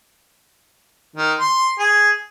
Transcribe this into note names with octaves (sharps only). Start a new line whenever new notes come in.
D#3
C6
G#4